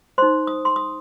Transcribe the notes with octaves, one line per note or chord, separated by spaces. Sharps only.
D#4 C5 C6
D#6
C6
D#6